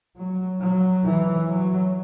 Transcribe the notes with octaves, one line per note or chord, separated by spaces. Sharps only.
F#3
F#3
E3
F#3